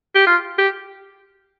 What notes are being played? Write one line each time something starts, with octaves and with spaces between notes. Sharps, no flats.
G4
F4
G4